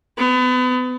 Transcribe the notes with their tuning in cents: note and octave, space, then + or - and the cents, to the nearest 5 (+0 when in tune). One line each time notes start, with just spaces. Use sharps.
B3 +35